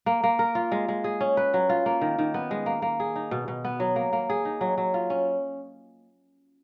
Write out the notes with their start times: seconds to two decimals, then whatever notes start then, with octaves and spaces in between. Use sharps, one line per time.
0.06 A#3
0.23 A#3
0.39 A#4
0.55 F4
0.72 G#3
0.88 G#3
1.04 G#4
1.21 C#4
1.37 B4
1.54 F#3
1.69 F4
1.86 A#3
2.01 D#3
2.19 D#3
2.34 B3
2.51 G#3
2.66 A#3
2.82 A#3
3.00 G#4
3.16 D#4
3.31 B2
3.48 B2
3.65 B3
3.80 F#3
3.96 A#3
4.13 A#3
4.30 G#4
4.45 D#4
4.61 F#3
4.78 F#3
4.94 F4
5.10 C#4